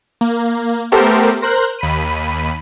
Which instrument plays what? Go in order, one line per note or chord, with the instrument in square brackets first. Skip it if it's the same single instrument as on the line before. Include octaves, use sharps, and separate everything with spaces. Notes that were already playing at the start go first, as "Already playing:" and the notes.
[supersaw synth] A#3
A3 B3 G4 A4 A#4 C5
A#4 C5 F#6
D#2 B5 D#7